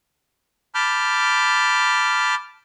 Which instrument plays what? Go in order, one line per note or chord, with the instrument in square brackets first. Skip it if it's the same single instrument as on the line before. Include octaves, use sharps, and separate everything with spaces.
[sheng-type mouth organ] A5 B5 D6 F6 G6